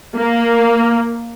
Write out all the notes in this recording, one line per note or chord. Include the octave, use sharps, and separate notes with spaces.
A#3